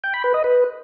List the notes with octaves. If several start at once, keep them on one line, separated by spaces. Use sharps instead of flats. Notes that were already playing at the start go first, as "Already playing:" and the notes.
G5
B5
B4
D#5
B4